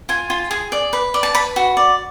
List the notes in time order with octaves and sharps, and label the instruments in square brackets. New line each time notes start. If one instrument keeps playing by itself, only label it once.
[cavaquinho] F4 G#5
F4
G#4
D5
B4
D5
A5
B4 B5
F#4
D5